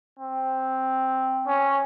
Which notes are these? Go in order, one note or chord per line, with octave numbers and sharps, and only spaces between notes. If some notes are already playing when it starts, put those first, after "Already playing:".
C4
C#4